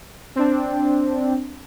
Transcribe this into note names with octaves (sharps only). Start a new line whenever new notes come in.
C4 D4